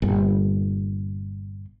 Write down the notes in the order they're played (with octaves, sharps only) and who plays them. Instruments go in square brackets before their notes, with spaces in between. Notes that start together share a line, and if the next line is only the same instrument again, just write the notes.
[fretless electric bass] G1 A#2